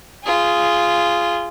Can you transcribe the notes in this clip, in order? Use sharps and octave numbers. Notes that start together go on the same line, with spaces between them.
F4 G#4